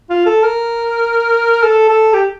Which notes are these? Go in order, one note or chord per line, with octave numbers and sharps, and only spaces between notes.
F4
A4
A#4
A4
A4
G4